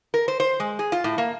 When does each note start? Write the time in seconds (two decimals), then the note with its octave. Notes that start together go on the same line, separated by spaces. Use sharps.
0.14 A#4
0.28 C5
0.40 C5
0.60 G#3
0.79 G#4
0.92 F4
1.04 A2
1.18 A#3